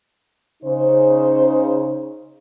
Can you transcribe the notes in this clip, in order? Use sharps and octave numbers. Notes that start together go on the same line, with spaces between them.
C#3 D#4 C5